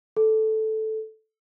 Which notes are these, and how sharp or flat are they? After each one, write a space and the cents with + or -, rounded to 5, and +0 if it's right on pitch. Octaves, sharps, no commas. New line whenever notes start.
A4 -5